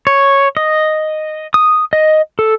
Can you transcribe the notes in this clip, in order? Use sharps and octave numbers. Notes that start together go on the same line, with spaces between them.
C#5
D#5
D#6
D#5
A4